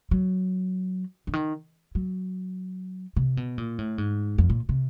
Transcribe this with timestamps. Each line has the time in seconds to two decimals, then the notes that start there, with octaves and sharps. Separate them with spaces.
0.11 F#3
1.27 D3
1.33 D#3
1.95 F#3
3.16 C3
3.37 B2
3.58 A#2
3.79 A2
3.98 G#2
4.38 F2
4.50 A#2
4.69 C3